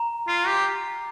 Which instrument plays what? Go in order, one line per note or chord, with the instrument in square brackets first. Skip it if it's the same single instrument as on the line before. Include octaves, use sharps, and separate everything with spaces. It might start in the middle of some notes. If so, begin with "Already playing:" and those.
Already playing: [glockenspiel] A#5
[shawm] F4 [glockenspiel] C7
[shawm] G4